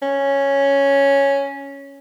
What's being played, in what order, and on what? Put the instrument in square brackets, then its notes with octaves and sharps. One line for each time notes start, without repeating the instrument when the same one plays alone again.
[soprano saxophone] C#4